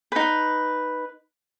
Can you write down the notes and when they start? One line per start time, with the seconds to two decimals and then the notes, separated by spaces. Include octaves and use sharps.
0.12 D#4 B4